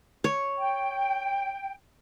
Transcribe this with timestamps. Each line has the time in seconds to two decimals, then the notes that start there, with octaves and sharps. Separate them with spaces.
0.24 C#5
0.58 G5